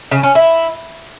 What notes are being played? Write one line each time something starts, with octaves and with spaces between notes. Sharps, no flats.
C#3
C#4
E4